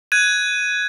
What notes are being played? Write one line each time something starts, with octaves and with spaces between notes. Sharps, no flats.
F#6 G#6 D#7